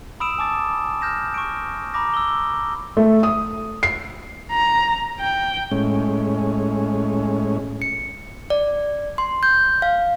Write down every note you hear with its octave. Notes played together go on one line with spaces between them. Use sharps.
B5 D#6 E6 D7 E7
G#5 A5 D6 D#6 A6
F6 G6 A#6 E7
C#6 D7
A#5 B5 D6 A#6
E6 G7
A3
D#6
C7
A#5
G5
A2 G#3 C#4
C#7
D5
C6
G6
F5